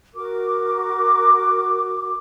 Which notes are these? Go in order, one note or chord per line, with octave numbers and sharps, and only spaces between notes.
F#4 A#4 D6